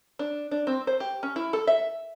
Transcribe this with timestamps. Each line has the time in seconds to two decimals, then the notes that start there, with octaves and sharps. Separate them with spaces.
0.19 D4
0.51 D4
0.67 C4
0.87 C5
1.00 G4
1.23 C#4
1.36 E4
1.53 A4
1.67 E5